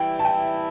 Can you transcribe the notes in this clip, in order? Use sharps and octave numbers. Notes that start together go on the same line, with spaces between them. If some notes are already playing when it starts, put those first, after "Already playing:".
Already playing: E3 G3 E4 G5
A5
G5